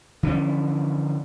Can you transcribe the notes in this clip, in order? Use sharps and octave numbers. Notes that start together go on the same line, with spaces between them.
D3 E3 F3 C#4